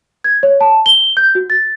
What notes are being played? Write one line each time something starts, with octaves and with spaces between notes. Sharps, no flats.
G#6
C#5
A5
G7
G6
F#4
A6